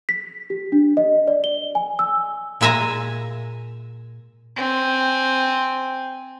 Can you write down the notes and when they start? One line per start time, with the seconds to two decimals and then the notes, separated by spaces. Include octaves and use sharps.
0.09 B6
0.50 G4
0.72 D4
0.97 D#5
1.27 D5
1.44 G7
1.75 G#5
1.99 E6
2.61 A#2 G#3 E5 G#5 A#5
4.56 C4 G#5